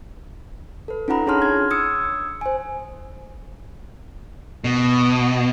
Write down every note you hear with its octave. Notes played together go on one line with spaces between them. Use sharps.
A4 B4
C#4 D#4 F4 F#5 A#5 B5
D4 G#4 C#5 A5 C6 F6
F6 G#6
D#6 E6 G#6 C#7
C5 G#5
B2